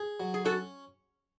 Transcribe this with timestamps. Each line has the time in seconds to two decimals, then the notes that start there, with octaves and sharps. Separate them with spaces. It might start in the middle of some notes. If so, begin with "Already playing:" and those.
Already playing: G#4
0.20 F#3
0.34 G#4
0.45 C#4 F#4 A4